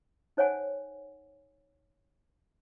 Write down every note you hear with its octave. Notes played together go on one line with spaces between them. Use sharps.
D#4 C5 C#5 F#5 G#5